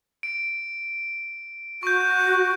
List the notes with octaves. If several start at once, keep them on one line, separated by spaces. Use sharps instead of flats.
D7
F#4 C#6 G6